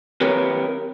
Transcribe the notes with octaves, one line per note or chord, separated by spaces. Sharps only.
C4 G4 A#4 B4 C#5